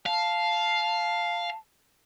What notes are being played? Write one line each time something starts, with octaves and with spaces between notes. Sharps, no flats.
F5 A5